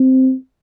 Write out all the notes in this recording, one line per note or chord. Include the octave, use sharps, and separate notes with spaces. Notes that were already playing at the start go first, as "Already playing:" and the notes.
Already playing: C4